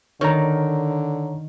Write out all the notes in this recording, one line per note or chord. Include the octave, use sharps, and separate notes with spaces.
D3 D#3 C#5 A#5